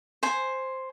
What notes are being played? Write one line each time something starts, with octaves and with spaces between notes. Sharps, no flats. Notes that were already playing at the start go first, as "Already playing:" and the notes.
C5 G#5